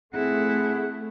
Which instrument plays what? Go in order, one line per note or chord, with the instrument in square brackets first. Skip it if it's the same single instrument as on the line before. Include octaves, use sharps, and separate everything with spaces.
[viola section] A3 [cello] C4 E4 [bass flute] G#4 [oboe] F#5